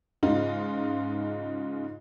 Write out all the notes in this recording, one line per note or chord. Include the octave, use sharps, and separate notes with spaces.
G#2 C#3 D#4 F4